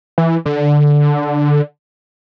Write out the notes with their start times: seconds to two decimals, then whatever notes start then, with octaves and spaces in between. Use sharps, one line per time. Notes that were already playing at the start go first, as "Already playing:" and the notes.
0.18 E3
0.46 D3